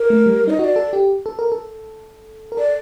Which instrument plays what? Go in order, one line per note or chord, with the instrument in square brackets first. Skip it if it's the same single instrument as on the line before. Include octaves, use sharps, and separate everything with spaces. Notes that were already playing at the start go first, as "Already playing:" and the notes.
Already playing: [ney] A#4
[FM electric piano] A3
G3
[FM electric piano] D#4 [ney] D#5
[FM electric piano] F#4 [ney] D#5
[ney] D5
[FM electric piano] A4
G4
A4
A#4
A4
A#4
[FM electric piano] A4 [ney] D5